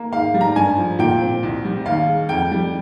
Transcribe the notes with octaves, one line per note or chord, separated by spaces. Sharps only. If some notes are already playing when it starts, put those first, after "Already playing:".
Already playing: A#3
G#2 F5
G3
A#5
G2 G#5
F3
A#2 G5
C4
C2
G3
D#2 F5
G#3
F2 G5
G3